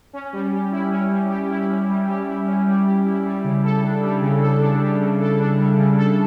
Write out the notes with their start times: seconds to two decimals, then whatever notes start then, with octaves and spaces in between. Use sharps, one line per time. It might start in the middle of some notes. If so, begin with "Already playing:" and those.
0.13 C#4
0.33 G3
0.52 G4
0.72 E4
0.91 C#4
1.11 G3
1.30 G4
1.50 E4
1.69 C#4
1.89 G3
2.08 G4
2.28 E4
2.47 C#4
2.66 G3
2.86 G4
3.06 E4
3.25 G3
3.44 C#3
3.64 A4
3.83 D4
4.03 G3
4.22 C#3
4.43 A4
4.62 D4
4.81 G3
5.01 C#3
5.20 A4
5.40 D4
5.59 G3
5.78 C#3
5.98 A4